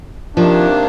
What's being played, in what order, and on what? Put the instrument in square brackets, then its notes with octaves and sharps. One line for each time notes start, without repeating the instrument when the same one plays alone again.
[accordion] C3 D#3 A#3 D4 [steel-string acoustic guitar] F3